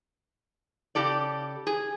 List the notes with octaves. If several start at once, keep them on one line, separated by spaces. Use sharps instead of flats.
C#3 G4 A4 D5
G#4